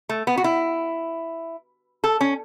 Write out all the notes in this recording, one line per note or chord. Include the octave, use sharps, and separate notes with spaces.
A3
B3
F#4
E4
A4
C#4